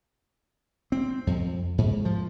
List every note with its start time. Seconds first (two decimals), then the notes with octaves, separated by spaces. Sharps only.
0.92 C4
1.27 F2
1.78 G#2
2.05 F3